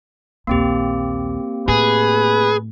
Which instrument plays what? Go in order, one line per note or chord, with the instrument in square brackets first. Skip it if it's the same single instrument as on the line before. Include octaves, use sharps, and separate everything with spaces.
[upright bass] A#1 D#2 [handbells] A#3 C4 G4
[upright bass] A2 [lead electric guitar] G#4 [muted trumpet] B4